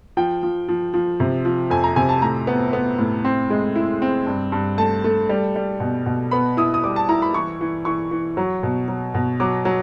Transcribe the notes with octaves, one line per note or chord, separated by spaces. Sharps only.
F3 G5
F3
F3
F3
C3
F3
F2 G#5
A#5
C3 G#5
A5
A2 A#5
B3
B3
A2
C4
G#3
E4
C4
G2
G2
A3 A5
A3
G3
G3
B2
B2
B3 B5
E4 D#6
D#6
G3 D6
A5
E4 A#5
B5
E3 C#6
E3
E3 C#6
E3
F#3
B2
F#3
B2
F#3 D6
F#3